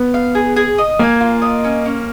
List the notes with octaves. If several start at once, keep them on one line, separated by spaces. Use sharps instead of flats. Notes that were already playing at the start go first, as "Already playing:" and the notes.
Already playing: B3
F5
G#4
G#4
D#5
A#3 G#5
F4
D#5
C#4
C#4